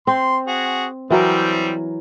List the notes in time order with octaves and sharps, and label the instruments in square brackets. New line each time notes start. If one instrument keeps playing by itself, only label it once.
[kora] C4 [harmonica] C6
[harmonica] F#4 G#4
[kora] E3 F#3 A#4 [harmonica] G3 C4